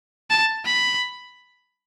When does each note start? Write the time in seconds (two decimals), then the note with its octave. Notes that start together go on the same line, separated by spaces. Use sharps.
0.30 A5
0.66 B5